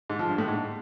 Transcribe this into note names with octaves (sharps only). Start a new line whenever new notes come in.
G#2
F3
G2
A2
G#2